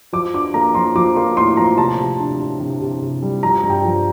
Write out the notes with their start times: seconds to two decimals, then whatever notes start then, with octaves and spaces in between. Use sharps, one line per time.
0.13 F3 D6
0.34 D4 D6
0.54 A#3 A#5
0.75 F3 C6
0.95 F3 D6
1.16 A#3 C6
1.37 A2 C6
1.57 F3 A#5
1.78 C3 A5
1.99 C3
2.20 D4
2.40 D4
2.60 C3
2.81 C3
3.02 C3
3.22 G3
3.43 F3 A#5
3.63 G2
3.70 G5
3.84 F3